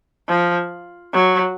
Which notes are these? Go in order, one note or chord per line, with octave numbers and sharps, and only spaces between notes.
F3
F#3